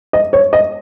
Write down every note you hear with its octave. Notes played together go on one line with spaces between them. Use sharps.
D#5
C#5
D#5